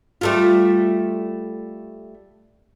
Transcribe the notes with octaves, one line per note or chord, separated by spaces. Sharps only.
G3 A3 F4